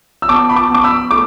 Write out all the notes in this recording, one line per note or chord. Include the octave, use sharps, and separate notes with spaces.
E6
B3 A5 D6
B5
A5 D6
B3 D6
B5 E6
A3 D6